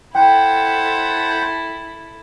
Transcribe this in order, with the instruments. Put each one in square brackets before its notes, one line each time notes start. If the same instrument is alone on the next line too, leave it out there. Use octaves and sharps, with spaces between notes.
[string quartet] E4 A4 [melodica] C5 F#5 [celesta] G5